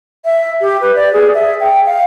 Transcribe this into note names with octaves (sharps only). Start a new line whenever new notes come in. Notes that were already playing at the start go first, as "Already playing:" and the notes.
E5
G4
B4
D5
G#4
E5
G5
F5